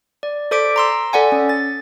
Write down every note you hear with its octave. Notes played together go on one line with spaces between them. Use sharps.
D5
A4 C5 D5 D6 B6 D7
A#5 C6 E6
A4 D5 F#5 G#5
C#4
A6